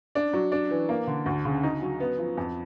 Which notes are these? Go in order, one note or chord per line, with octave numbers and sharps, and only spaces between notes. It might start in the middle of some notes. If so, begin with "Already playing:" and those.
D4
F#3
D4
E3
A#3
D3
D2
C#3
D#4
F#3
B3
F3
F2